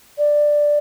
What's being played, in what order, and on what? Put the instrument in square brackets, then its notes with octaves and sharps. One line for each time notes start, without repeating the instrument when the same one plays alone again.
[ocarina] D5